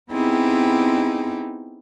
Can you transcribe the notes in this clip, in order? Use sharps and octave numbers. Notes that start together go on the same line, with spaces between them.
B3 C4 D#4 E4 G4 G#4